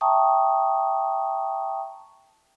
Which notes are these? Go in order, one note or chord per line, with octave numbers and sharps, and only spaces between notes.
E5 G5 A5 A#5 C#6 D#6